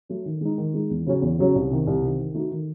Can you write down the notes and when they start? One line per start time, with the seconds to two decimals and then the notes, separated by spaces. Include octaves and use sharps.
0.09 F#3 A3
0.25 D#3
0.41 G#3 D#4
0.58 D#3
0.74 G#3 D#4
0.90 E2
1.06 C#3 F#3 C#4
1.22 E2
1.38 C#3 F#3 C#4
1.55 C2
1.71 C3 D#3
1.87 C2
2.02 C3 D#3
2.19 D#3
2.34 A3 D#4 F#4
2.51 D#3